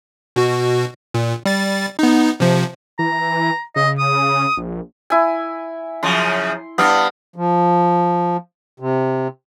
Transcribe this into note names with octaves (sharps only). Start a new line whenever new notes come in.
B2 F#4
A#2
G3 A6
B3 D#4
C3 F3
E3 A#5
C#3 D#5
D#6
A#1
E4 G#5
F#2 C#3 F3 C6
G2 G3 B3 F5
F3
C3